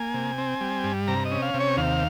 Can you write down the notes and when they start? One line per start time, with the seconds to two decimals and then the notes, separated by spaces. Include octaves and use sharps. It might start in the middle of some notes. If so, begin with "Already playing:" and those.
Already playing: A#3 G#5
0.14 C3
0.38 C4
0.61 G3
0.84 G2
1.08 C3 A#5
1.25 D#5
1.31 C#4
1.42 F5
1.54 C3
1.60 C#5
1.77 D#2 F5